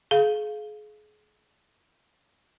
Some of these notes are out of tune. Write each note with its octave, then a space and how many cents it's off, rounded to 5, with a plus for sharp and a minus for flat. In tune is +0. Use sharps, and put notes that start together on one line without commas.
G#4 +35 F5 +0